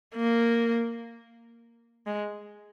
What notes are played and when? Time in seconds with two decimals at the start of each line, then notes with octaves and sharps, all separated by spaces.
0.15 A#3
2.07 G#3